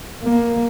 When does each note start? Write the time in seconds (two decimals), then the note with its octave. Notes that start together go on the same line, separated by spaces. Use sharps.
0.23 A#3